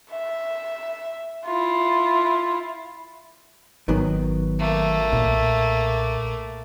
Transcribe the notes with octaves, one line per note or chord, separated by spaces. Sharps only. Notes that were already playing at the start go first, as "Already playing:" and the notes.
E5
E4 F4
G#1 D#3 F#3 B3
A3 A#3
B1 A#2